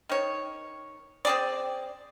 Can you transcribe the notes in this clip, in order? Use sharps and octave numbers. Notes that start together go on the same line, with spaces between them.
D#3 C#5
C4 G#4 D5